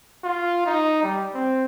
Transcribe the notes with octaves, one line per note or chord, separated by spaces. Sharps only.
F4
D#4
G3
C4